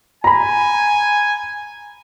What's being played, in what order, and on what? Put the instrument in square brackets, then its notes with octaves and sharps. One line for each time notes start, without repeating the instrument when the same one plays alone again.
[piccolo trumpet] G#5 [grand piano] A#5 B5